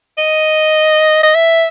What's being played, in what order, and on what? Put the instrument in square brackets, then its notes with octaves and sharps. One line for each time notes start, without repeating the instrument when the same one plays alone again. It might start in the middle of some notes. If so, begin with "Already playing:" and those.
[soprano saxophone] D#5
D#5
E5